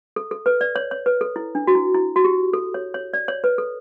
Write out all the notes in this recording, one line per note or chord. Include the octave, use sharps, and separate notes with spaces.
A4
A4
B4
D5
C#5
C#5
B4
A4
E4
D4
F#4
E4
E4
F#4
G4
A4
C#5
C#5
D5
C#5
B4
A4